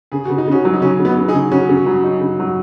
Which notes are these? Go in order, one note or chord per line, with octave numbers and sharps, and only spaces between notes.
C#3 G#4
C#3 F#4
D#4
C#3 C#4 F#4
F#3
D#4
C#3 C#4 F#4
C#3
B3 D#4
C#3
D#4 G#4
C#3
C#3 C#4 F#4
C#3
F#3
D#4
C#3
F#3